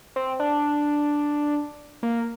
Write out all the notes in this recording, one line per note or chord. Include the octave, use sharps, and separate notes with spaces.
C4
D4
A#3